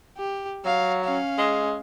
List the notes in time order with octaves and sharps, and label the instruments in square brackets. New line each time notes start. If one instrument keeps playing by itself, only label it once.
[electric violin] G4
[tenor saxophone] F#3 [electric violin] F5
[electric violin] C#4 F5
[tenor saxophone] G#3